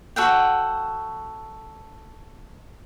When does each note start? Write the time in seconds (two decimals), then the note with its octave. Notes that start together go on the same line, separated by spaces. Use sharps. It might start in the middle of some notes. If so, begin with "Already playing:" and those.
0.16 F#4 A4 F#5 G5